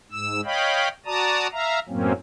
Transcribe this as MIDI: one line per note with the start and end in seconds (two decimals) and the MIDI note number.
0.12 0.41 44
0.12 0.41 88
0.45 0.88 73
0.45 0.88 75
0.45 0.88 77
0.45 0.88 79
0.45 0.88 83
1.06 1.47 66
1.06 1.47 74
1.06 1.47 81
1.06 1.47 82
1.06 1.47 87
1.52 1.79 76
1.52 1.79 77
1.52 1.79 82
1.89 2.12 42
1.89 2.12 45
1.89 2.12 54
1.89 2.12 58
1.89 2.12 60
1.89 2.12 61